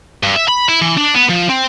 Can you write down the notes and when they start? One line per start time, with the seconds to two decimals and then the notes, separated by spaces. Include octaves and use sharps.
0.23 G2
0.36 E5
0.49 B5
0.69 E4
0.82 E3
0.97 D4
1.14 B3
1.29 F3
1.49 C4